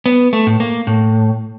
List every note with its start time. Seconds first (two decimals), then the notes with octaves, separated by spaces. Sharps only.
0.06 B3
0.33 A3
0.47 A2
0.60 A#3
0.87 A2